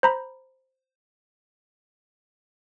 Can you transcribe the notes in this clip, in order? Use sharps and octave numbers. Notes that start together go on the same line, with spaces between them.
C5 A#5 B5